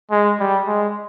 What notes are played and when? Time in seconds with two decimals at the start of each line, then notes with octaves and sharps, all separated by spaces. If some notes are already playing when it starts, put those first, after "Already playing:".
0.11 G#3
0.39 G3
0.67 G#3